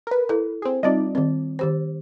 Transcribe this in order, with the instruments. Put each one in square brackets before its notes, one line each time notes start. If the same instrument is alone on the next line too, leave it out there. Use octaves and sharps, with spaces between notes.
[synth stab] A#4 B4
[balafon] E4 A4
[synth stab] C4 G#4
[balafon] G3 C4 F4 [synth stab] D#4 D5 D#5
[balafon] D#3 C4
D#3 G4 C5